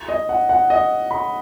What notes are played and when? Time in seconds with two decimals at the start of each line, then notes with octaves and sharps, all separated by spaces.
0.09 D#5
0.29 F#5
0.49 F#5
0.70 D#5
1.11 B5